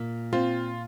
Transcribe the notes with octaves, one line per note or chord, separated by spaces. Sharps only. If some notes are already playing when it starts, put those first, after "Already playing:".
Already playing: A#2
C4 F4